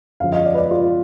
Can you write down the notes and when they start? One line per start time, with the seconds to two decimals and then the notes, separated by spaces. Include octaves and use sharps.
0.20 F#2 D3 F3 F5
0.32 D#5
0.46 D5
0.54 B4
0.58 D5
0.71 F4